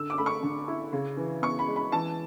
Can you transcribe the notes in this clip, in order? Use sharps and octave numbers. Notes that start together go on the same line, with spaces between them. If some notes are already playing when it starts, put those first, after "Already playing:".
Already playing: D3 E6
D6
A3 B5
C#6
D3
E4
C#3
E3
B3 C#6
B5
G#3
B5
E3 A5